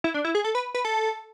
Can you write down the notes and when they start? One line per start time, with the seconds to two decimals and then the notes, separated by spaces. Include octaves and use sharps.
0.04 E4
0.14 D4
0.25 E4
0.35 G#4
0.44 A4
0.55 B4
0.74 B4
0.85 A4